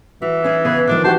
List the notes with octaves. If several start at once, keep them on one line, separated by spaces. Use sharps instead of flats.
E3 F#4
C#4 E4 G#4
C#3 B3 G#4 B4
D#3 F3 A#3 D4
E3 F#4 G4 C5 A5